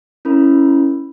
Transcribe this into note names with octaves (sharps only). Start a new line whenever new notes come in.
C#4 E4 A#4 B5